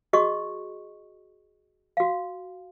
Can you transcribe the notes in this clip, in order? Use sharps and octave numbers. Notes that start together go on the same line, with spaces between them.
F#4 G#4 D#5 C#6
F#4 F5